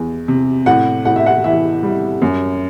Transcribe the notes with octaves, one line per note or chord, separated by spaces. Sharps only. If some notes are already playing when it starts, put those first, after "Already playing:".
Already playing: E2
C3
A2 F#5
A2 F#5
E5
F#5
E3 E5
G3
F#2